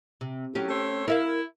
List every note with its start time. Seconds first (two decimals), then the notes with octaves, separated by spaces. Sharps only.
0.21 C3
0.55 A2 F#3 C#4 G4
0.69 A3 C4 C#5
1.08 E4 A#4 E5 F5